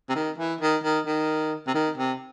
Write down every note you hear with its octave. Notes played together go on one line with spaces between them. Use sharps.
C3
D#3
E3
D#3
D#3
D#3
C3
D#3
C3